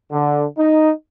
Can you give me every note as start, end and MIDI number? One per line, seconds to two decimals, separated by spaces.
0.11 0.46 50
0.58 0.90 63